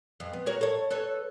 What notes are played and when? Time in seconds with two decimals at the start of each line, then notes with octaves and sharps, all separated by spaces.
0.20 F2
0.33 B3
0.46 F#4 A#4 C#5
0.61 A4 C#5
0.90 A4 B4 C#5